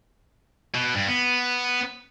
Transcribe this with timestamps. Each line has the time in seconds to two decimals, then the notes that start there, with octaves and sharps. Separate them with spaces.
0.74 B2
0.95 G2
1.08 B3